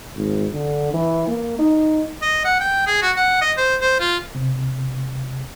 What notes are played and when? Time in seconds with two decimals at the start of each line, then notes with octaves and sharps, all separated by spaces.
0.16 G#1
0.52 D3
0.94 E3
1.27 A#3
1.59 D#4
2.22 D#5
2.45 F#5
2.61 G5
2.87 G#4
3.02 F#4
3.16 F#5
3.41 D#5
3.57 C5
3.81 C5
4.00 F4
4.35 C3